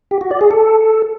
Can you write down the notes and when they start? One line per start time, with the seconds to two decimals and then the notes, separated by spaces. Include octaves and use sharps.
0.11 G4
0.21 F#4
0.31 D5
0.41 G#4
0.51 A4